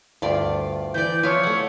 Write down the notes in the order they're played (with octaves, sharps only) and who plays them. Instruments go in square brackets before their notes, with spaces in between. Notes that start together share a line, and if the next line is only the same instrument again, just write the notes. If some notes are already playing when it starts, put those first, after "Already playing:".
[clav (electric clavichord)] D2 G2 G5 [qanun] F4 D5
[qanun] E3 D5 [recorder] G6
[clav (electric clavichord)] F3 E4 B4 [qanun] F4 F5 [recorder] C#5
[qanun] A3 F#5